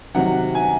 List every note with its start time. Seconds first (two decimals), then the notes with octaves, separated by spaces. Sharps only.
0.15 C3 D#3 F#3 F#5
0.55 G#5